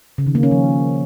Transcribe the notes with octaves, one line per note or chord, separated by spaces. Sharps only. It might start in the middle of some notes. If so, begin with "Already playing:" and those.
C#3
D#3
A#3
C#4
F3